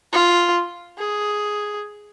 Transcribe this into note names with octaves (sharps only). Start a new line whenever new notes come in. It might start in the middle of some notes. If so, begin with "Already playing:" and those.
F4
G#4